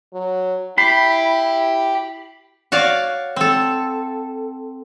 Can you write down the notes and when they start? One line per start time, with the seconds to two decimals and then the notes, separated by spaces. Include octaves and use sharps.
0.13 F#3
0.78 E4 G4 B5 C7
2.72 F#4 C#5 D5 F5
3.36 C4 A4